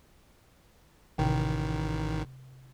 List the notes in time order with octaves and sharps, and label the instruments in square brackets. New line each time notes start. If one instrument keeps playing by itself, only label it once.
[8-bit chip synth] A1 D#3 [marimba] C3 G5